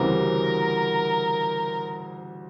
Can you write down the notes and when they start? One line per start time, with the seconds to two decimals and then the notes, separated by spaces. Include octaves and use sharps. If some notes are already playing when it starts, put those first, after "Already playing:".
Already playing: D2 C#3 E3 G3 C4 A#4